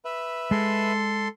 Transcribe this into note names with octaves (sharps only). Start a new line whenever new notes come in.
B4 E5
G#3 A4 C6